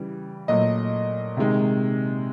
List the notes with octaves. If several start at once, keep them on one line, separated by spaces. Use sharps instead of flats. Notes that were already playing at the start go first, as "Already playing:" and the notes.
Already playing: C#3 E3 G3
A#2 F#3 A3 D#5
C3 D#3 G#3